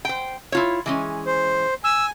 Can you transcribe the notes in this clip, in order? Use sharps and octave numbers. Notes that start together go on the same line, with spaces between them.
C5 G5
E4 F4 C#5
E3 G#3 C#4
C5
G#5 E6